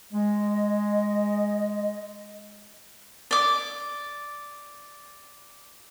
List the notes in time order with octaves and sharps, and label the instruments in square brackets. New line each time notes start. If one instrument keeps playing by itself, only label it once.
[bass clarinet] G#3 [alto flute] D#5
[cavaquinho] D5 D6